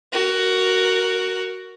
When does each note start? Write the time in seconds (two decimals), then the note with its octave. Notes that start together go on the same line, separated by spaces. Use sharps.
0.13 F#4 A#4